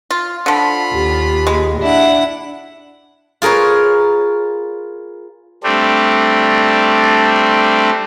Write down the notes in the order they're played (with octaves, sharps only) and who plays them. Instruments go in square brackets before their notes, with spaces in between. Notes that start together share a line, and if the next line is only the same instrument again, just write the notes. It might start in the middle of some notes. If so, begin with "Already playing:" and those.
[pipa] F4
[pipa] D3 F3 [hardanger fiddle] F4 B5
[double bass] D#2 [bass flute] G4
[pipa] G#3
[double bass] D4 [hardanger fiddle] E4 F#5
[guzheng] F4 G#4 A#4 B4 C#5
[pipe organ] G3 A3 C4 D4